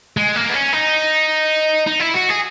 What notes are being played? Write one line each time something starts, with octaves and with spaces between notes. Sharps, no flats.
G#3
A#3
B3
C#4
D#4
D#4
E4
F#4
G#4